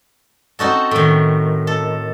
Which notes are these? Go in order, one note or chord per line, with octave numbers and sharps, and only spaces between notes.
C4 D#4 F#4 A4
A2 D#3
A4